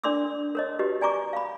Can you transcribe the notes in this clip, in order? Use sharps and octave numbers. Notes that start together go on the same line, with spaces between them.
D4 A#4 D5 C6 D6 E6
A#4 C#5 D#5
F#4 G4 B4 D#5
D5 G#5 A#5 C#6 D6
F5 B5